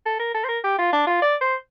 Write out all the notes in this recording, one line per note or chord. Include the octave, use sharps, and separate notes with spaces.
A4
A#4
A4
C5
A#4
G4
F4
D4
F4
D5
C5